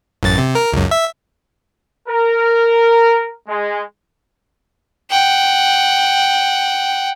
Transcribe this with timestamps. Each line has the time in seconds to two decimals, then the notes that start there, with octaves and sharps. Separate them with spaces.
0.23 A1 F#2 A6
0.38 C3
0.55 A#4
0.73 C#2 F#2
0.91 E5
2.08 A#4
3.48 G#3
5.10 F#5 G5